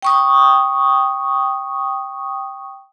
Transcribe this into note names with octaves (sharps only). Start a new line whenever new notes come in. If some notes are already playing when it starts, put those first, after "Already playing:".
G5 C#6 D#6